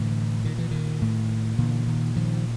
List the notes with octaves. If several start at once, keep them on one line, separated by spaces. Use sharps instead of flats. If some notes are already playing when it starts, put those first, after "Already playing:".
Already playing: A2 D3 E3
A#2 D#3
E3
D#3
A2
A#2 D3 E3
D#3
A#2 D#3 F3